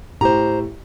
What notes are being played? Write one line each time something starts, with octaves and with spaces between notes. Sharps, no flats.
A2 G4 C5 A#5